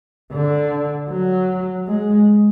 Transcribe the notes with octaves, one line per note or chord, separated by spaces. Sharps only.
D3
F#3
G#3